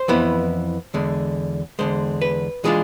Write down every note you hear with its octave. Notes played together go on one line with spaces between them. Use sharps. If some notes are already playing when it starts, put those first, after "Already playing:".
Already playing: C5
F2 E3 B3 E4
E2 D3 G#3
E2 D3 G#3 C5
B4
E3 G#3 D4 F4 G#4